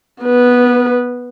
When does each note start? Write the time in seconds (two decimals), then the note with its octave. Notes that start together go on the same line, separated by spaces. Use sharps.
0.23 B3 B4